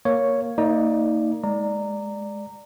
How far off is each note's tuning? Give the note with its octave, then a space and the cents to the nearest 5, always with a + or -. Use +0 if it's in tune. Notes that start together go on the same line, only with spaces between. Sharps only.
A#3 +0 C#5 +0
A#3 -30 D#4 +20 D5 +15
G#3 +0 D5 +5 A#5 -15